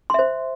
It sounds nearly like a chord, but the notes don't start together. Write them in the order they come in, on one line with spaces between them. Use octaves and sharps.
C6 E5 C5